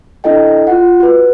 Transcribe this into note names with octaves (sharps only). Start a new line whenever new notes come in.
D4 E4 A4 D#5 G5
F4 F#5
F#4 B4